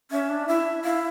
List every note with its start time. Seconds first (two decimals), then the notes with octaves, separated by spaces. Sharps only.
0.11 C#4 E5
0.29 D4
0.47 E4 E5
0.84 E4 F5